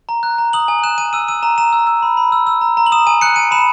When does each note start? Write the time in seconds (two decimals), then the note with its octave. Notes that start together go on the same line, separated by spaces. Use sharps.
0.09 A#5
0.23 F#6
0.38 A#5
0.53 D#6 F#7
0.68 G#5 F#7
0.83 F#6 E7
0.98 G#5 D#7
1.13 E6 D#7
1.28 E6 D#7
1.43 A#5 E7
1.58 A#5 E7
1.73 E6
1.87 E6
2.03 B5
2.17 B5
2.32 E6
2.47 E6
2.61 A#5
2.77 A#5
2.86 F#7
2.92 D#6 E7
3.07 G#5 D#7
3.21 F#6 C#7
3.36 G#5 D#7
3.51 B5 E7